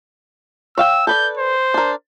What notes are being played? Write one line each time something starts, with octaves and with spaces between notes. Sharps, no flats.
C#5 F5 G5 E6
A4 B4 D5 G6
C5
D4 A#4